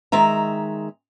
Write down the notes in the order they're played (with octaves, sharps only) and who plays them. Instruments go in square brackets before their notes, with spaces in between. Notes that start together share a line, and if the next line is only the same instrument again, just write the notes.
[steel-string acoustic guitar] D#3 G#3 E5 A#5